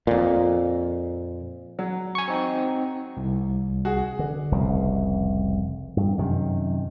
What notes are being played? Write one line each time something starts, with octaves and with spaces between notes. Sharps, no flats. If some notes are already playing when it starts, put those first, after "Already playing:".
F2 A#2
F#3
G#5 C#6
C4 D#4
C2
F#4 G#4
D3
F1 C2 C#3
G2
F#2 C3 D#3